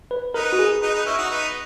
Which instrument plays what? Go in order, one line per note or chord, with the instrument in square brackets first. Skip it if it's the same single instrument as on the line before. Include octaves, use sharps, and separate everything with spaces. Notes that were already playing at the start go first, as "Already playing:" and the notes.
[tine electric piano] B4
[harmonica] B3 D#4 [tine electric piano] A#4
[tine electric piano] F#4
G#4
[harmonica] B3 D#4
B3 D#4
C#4 E4
D#4 F#4
B3 D#4